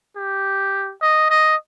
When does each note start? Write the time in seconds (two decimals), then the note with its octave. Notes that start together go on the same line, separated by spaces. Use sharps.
0.16 G4
1.02 D#5
1.30 D#5